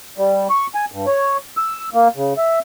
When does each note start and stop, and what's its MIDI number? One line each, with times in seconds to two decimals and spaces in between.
0.18 0.48 55
0.50 0.67 85
0.75 0.85 80
0.92 1.06 43
1.07 1.37 73
1.57 1.89 88
1.94 2.08 58
2.16 2.33 49
2.37 2.59 76